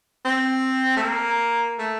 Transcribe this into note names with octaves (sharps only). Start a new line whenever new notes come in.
C4
A3
A#3
A3